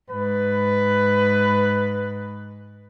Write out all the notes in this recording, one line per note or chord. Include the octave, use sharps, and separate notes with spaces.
G#2 B4